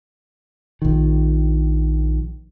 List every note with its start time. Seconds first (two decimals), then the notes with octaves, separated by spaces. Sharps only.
0.82 A#1 D#3